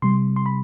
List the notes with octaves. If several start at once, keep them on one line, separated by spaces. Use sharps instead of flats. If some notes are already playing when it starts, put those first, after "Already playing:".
C3 G3 C6
C6
B5